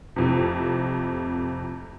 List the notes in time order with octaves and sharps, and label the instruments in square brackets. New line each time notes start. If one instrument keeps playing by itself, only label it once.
[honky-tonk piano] F2 A2 C3